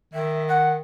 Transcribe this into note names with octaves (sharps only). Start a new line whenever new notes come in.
D#3 E5
F#5